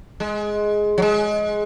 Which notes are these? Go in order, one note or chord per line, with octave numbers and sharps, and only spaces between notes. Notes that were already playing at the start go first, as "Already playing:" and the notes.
G#3
F#3
G#3